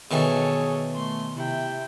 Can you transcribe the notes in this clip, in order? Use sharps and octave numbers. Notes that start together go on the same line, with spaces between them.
B2 D#3 E3 G#4 A4 C#5
A3 C6
C3 E4 G5